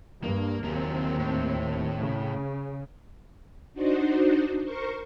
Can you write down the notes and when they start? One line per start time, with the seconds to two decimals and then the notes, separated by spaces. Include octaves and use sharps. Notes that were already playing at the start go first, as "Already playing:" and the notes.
0.24 G2 A#3
0.64 D#2 F#3 A#3 C4
1.19 A2
2.01 C#3
3.74 D4 D#4 F#4 C5
4.63 A#4 C5 C#6